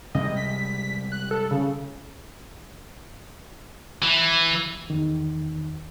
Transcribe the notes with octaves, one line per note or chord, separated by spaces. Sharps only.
C3 G3 G#3 D#5
B6
F#6
A4
C#3
E3
E2 D#3